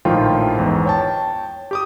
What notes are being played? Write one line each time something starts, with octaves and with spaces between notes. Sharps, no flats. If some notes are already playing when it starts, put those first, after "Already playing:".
A#1 A2 D#3 F3 F4 G5
E2 G#2
C#5 G5 A5
G4 D6 D#6